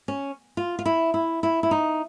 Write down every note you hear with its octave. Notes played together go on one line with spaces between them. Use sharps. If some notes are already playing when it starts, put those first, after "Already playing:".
C#4
F4
F4
E4
E4
E4
E4
D#4